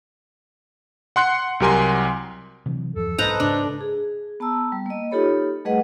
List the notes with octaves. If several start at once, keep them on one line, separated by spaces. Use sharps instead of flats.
F#5 C6 F#6 C#7
C2 F#3 G4 A#4 G#5 C6
C3 E3 F#3
E2 G2 F3 A4
B1 G#2 B4 C5 D#5 A5 A#5
G#2 C#3 D4
G#4
B3 A5 A#5 E6
G3
A#3 D#5
D#4 F4 G4 A4 C#5 B5
G3 A3 G#4 B4 D#5 F#5